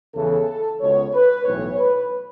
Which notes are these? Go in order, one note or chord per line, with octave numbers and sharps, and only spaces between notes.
E2 C#3 E3 A4
C#2 B2 C#5
B4
B1 A2 E3 C#5
B4